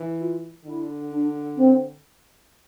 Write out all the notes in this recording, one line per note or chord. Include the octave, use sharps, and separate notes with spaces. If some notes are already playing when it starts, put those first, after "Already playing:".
Already playing: E3
F4
D3 E4
D4
C4